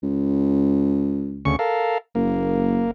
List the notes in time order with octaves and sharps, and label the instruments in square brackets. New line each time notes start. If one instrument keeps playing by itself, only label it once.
[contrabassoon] C#2
[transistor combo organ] D2 C#3 C#6
A4 A#4 F5
[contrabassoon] F#1 [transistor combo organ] A#3